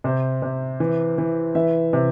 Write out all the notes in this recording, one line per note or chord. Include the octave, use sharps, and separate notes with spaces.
C3 C5
C3
E3
E3
E3 E5
C3